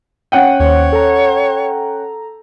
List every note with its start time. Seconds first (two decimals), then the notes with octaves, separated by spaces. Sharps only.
0.32 C#4 F#5 G5 D#7
0.60 D#2 C5 C#5
0.92 A4 A#5